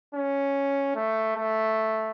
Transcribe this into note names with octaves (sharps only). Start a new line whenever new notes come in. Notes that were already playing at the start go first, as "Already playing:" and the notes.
C#4
A3
A3